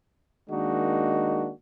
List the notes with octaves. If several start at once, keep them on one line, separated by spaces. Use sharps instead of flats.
D#3 G#3 A#3 D4 D#4 F#4